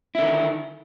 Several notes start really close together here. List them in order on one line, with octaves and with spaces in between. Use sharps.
E4 D3 D#3